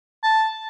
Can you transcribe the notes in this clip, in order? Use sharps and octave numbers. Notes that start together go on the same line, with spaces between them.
A5